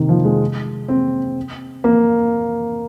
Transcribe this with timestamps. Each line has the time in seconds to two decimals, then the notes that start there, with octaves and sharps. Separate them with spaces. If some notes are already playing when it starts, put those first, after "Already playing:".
Already playing: C3 D#3
0.09 F3
0.25 G#3
0.88 C4
1.84 A#3